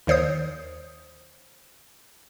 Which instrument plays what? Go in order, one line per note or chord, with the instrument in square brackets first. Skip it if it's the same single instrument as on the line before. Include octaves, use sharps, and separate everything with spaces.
[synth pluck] D#2 D#3 C5 C#5 D#6 G6